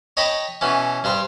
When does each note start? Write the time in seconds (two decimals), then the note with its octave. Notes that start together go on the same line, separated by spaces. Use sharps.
0.17 C#5 D#5 G5 A5 B5
0.61 B2 E3 C#4
1.04 G2 G3 C5 G5